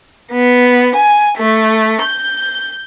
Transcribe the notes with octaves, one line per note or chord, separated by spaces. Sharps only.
B3
G#5
A3
G6